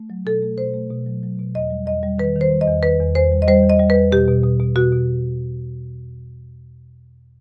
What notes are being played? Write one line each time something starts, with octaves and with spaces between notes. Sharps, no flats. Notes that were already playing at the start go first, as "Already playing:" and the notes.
Already playing: A3
F#3
B2 A4
A3
B2 C5
A3
B2
F#3
F#3
B2
E2 D#5
G3
E2 D#5
G3
D#3 B4
D#3
C5
G3
D#5
E2
D#3 B4
E2
E2 C5
G3
D#5
G3 C5
E2
D#5
G3
B4
E2
B2 G4
B2
B2
B2
B2 F#4
B2